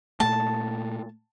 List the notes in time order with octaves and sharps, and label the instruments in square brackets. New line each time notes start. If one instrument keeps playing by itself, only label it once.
[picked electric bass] A#2 A3 [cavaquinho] A5